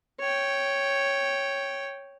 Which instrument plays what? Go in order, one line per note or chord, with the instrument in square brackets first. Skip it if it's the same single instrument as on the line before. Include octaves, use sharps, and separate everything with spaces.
[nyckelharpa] C#5 G5